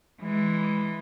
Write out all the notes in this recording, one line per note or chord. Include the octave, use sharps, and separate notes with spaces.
E3 G#3